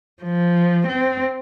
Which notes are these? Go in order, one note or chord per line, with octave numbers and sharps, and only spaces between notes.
F3
C4